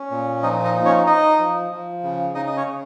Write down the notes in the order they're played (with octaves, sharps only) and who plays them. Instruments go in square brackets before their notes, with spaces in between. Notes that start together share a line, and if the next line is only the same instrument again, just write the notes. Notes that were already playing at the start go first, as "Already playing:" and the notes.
Already playing: [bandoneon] C#4
A#2
F3 D#4 D#5
D#4 D#5
D#4
C#4 C#5
D#4 D#5
F3
F3
C#3
C#3 D#4 D#5
D#5
C#4 C#5
C#3